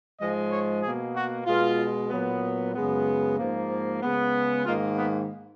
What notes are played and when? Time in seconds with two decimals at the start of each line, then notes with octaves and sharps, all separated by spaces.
0.19 G#2 F3 G#3 D#5
0.50 C#5
0.82 B2 A#3 G#4
1.15 F#4
1.46 B2 G#3 B3 F4
2.10 A#2 F#3 B3
2.75 F#2 C#3 G#3 B3
3.37 G#2 F3 A#3
4.02 C#3 G#3 B3
4.65 G#2 D#3 A#3 F4
4.97 B3